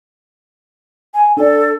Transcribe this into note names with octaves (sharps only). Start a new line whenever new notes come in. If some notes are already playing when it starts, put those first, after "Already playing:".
G#5
D4 A4 D5